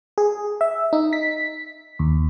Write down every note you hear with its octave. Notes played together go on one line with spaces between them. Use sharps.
G#4
E5
D#4
B6
D#2